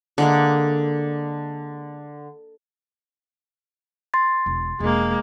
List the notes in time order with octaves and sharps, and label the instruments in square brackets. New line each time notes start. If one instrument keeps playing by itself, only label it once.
[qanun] D3 G#3 A#3
[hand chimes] C6 A6
[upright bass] E1
[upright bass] E1 [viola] G#3 A#3